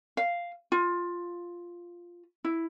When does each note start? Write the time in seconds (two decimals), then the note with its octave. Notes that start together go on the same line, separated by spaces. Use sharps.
0.17 F5
0.72 F4
2.44 E4